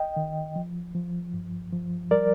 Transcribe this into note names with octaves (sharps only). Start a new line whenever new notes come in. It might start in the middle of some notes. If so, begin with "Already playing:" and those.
Already playing: D#5 G5
D#3
F3
F3
G2
F3
G3 A#4 D5